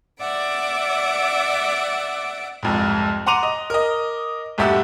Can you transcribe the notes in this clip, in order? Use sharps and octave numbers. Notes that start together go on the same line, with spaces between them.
D5 E5 F#5 D6
C2 F2 G#2
F#5 A#5 C6 D6 D#7 F7
D#5
A#4 D#5
B1 G2 A3 G4 F#5 E6